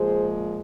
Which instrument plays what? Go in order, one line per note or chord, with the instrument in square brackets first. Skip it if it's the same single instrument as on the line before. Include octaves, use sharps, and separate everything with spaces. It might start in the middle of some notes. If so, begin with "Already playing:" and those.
Already playing: [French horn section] A#2 F3 G#3 G#4 C5